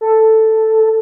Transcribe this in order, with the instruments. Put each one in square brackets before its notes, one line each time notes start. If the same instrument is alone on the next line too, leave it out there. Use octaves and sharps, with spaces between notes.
[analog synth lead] A4